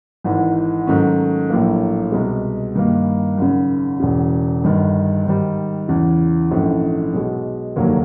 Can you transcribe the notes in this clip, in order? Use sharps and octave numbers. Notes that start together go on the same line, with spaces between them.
G#1 G#2 E3
G#2 D#3 F#3 A3 C#4
A#1 A2 F#3 A#3
C2 B2 G#3
G2 D#3 G3 A#3
G#1 F#2 C#3
E1 E2 C#3
G1 G2 D#3
G#2 D#3 G3
E2 C#3 E3
A#1 G#2 E3 A3 C#4
B1 B2 G#3
F1 D#2 D3 F#3 A#3